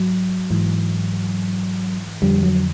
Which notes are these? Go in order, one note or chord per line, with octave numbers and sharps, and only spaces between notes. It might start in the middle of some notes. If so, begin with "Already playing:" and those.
Already playing: G#2 F#3
G#2 E3
F2 D3 F3 G3
F#3